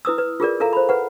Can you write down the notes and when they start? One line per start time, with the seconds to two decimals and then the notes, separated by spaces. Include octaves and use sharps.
0.05 E4 B4 D#6 E6
0.18 B4
0.40 F4 G#4 A#4 D5
0.60 A4 A#4 E5 F5 A#5
0.73 C5 B5
0.89 B4 F#5